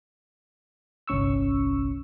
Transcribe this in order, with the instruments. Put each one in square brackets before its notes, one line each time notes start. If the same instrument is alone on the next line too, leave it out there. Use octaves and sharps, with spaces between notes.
[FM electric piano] G1 C2 C#4 C#6 E6